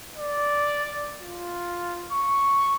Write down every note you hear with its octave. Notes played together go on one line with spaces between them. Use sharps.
D5
F4
C#6